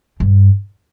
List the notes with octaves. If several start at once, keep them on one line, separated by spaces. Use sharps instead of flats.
G2